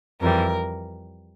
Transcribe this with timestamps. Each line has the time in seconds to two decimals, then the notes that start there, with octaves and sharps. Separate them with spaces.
0.21 F2 E3 G3 A#4